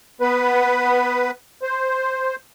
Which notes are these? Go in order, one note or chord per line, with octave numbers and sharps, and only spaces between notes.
B3 B4
C5